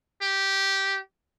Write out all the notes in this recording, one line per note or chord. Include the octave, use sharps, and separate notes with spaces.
G4